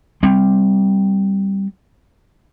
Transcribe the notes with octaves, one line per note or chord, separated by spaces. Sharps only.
G3 C4